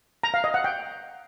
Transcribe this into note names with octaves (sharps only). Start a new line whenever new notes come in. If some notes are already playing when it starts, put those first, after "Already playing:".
A#5
F5
D#5
F#5
G5